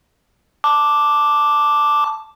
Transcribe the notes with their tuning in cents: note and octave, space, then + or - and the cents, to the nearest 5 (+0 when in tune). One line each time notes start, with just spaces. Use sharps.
A5 +0 D6 +0